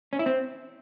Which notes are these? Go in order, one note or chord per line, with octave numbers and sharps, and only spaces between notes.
C#4
E4
C4